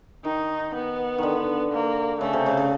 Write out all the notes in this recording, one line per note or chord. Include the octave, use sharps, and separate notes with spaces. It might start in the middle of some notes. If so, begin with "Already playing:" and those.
D#3 D#4
B3
D3 D#3
A#3
C#3 A3
C3
C#3
C#3